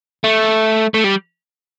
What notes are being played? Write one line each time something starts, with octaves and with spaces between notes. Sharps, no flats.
A3
A3
G3